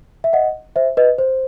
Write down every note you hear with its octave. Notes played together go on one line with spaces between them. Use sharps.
E5
D#5 F#5
C5 E5
B4 D#5
C5